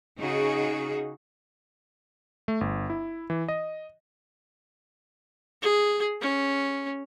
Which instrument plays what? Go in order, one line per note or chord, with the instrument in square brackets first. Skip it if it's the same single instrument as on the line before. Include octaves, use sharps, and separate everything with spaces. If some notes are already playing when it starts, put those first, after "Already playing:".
[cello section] C#3 D#4 F#4 G#4
[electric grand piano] A3
G1
E4
E3
D#5
[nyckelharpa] G#4
C#4